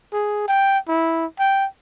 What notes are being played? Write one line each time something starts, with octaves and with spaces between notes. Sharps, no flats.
G#4
G5
E4
G5